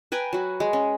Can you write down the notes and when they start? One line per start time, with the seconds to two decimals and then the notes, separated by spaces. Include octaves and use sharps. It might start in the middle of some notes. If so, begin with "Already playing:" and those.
0.12 B4 G5 G#5 A#5
0.33 F#3 F#4
0.60 G#3
0.73 C#4